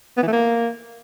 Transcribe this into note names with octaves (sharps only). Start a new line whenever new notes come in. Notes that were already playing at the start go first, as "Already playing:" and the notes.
B3
E3
A3
A#3